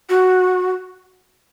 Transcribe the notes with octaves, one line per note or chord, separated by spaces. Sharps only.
F#4